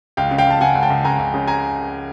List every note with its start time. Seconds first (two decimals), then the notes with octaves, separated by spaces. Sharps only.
0.17 C#2 F5 G5
0.31 C#3
0.38 F5 G5
0.47 C#2 A5
0.61 C#3 F#5 G#5
0.75 C#2
0.83 G5 A5
0.90 C#2
1.04 C#2 G#5 A#5
1.19 C#2
1.34 C#3
1.47 G#5 A#5